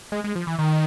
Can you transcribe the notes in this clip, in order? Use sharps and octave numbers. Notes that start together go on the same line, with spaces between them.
G#3
G#3
F3
E3
D#3